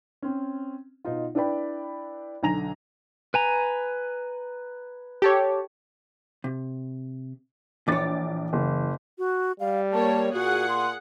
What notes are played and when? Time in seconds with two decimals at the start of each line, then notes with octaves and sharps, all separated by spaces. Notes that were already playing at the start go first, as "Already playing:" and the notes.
0.22 C4 C#4
1.05 B2 D#4 F4
1.35 D4 E4 B4 D5 G5 B5
2.43 B1 D3 G#5 A#5 A#6 F7
3.34 B4 G#5 A#5
5.22 G4 A4 C#5
6.44 C3
7.88 A#1 E3 C#5 D6 A6
8.53 F#1
9.18 F#4
9.60 G3 F5
9.93 A#3 C#5 A5
10.34 A#2 F#4 G#4 F#5
10.69 C6